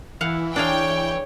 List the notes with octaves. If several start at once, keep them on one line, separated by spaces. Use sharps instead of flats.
E3 E4 F5 F#5
D4 G#4 C#5 F5 G5